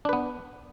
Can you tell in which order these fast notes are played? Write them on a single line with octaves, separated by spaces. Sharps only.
D4 B4 B3